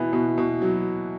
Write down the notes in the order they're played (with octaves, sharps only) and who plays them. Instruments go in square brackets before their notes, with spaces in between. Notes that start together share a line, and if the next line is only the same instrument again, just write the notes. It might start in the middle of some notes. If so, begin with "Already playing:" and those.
Already playing: [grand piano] B2 B3 [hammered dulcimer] E3
[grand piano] B2
B2
F#3